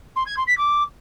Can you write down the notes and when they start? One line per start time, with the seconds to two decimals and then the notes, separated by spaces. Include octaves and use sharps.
0.16 C6
0.26 G#6
0.37 C6
0.47 B6
0.58 D6